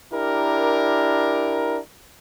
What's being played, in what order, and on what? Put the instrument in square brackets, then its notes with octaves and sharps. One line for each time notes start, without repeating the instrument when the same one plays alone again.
[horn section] D4 E4 G4 A#4